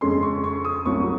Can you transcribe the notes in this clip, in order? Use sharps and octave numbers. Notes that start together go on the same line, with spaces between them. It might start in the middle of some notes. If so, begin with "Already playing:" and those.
F2 C#3 G#3 C#4 C6
C#6
C#6
D#6
C2 C3 F#3 C#4 F4 C#6